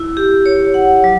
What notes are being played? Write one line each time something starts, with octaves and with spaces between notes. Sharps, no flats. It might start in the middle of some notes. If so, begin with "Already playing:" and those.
Already playing: E4
G4
C#5
F#5
F#3